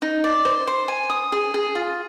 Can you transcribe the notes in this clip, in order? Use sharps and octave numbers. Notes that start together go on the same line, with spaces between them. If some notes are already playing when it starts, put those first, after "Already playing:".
D#4
D5
C5
C5
G#5
D#6
G#4
G#4
F4